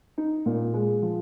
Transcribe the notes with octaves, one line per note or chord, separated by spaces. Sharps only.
D#4
A#2
G#3
F3